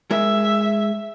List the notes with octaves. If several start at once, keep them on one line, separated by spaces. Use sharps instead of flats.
G#3 G#4 A#4 E5